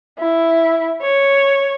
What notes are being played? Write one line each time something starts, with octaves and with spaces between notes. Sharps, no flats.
E4
C#5